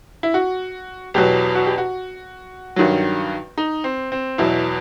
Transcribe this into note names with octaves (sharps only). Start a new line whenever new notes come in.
E4
F#4
E2 B2 F#3 G4
F#4
G4
F#4
G2 D#3 F#3
D#4
C4
C4
E2 B2 F#3 E4